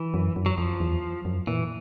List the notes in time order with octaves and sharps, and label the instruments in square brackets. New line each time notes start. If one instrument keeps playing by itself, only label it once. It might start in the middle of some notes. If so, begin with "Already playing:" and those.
Already playing: [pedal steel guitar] E3
[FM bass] F#2
F#2
[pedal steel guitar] F#3
[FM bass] F2 [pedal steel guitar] F3
[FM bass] E2
F#2
[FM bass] A#2 [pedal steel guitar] E3